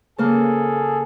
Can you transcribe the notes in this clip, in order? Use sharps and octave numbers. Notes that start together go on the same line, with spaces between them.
C#3 A#3 G#4 A4